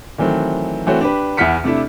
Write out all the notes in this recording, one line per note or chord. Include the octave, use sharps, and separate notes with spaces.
D#3 E3 F#3 A3 C4
E3 A3 C4 F#4 C#5
D4 G4 B4
E2 E4 F#5 F6 B6 C#7
C3 A3 D4 E4